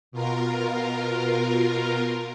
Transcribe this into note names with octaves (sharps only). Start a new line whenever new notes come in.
B2 F4 A#4